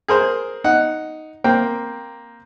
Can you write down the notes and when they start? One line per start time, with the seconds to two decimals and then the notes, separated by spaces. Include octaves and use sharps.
0.08 G#4 A#4 C5
0.64 D#4 F#5
1.44 A#3 C4 G5